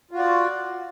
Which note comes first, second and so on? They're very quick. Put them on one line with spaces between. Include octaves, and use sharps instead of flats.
F4 F#4 D5